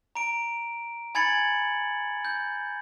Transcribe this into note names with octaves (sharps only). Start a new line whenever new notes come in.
A#5 D7
G#5 B5 G#6 A6 C#7 F#7
G6